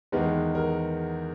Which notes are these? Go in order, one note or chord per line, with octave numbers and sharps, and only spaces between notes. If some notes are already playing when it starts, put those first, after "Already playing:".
E2 D#3 G#3 B3 A#4
A#4